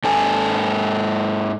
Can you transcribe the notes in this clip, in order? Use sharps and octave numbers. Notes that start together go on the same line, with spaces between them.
G#2 A4 G#5